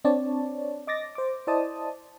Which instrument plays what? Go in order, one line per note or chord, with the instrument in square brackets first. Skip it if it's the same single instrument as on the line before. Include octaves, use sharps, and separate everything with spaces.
[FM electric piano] C4 D4 C#5 D5 A5
D#5 D6 A6 A#6
C5 D6
E4 C5 D5 D#5 A5 D#6